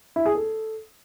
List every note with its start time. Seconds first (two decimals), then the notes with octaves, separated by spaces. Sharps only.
0.16 E4
0.26 G#4
0.35 A4